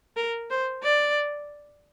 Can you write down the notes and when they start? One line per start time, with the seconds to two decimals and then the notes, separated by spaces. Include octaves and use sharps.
0.17 A#4
0.50 C5
0.84 D5